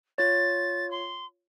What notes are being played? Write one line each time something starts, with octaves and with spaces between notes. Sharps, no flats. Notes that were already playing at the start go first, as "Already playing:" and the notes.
F4 C#5 A6
C6